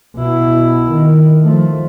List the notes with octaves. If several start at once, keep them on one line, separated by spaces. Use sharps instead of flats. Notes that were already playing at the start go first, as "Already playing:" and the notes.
B2 E4
D#3
F3 A3